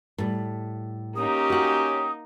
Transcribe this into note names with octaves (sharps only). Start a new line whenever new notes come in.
A2 G3
A#3 C#4 D#4 G4 D#6
F#4 F#5